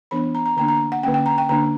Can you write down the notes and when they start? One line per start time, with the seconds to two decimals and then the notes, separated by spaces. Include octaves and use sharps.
0.11 E3 B3 D4 B5
0.35 A#5
0.46 A#5
0.57 D3 A#3 D4 A#5
0.68 A#5
0.92 F#5
1.03 C#4 G5
1.06 D3 A#3
1.14 G5
1.26 A#5
1.38 G5
1.49 D3 A#3 D4 A#5